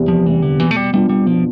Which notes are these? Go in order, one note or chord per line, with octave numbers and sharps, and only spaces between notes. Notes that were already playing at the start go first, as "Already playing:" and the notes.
Already playing: E2 C3 G3 B3
F3
C3 E3 G3 B3
D3
B2 E3
A3
G3
G3 B3 D4 F4
G3
B2 F3